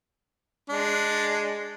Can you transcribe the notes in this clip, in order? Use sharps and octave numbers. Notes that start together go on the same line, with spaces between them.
G#3 D4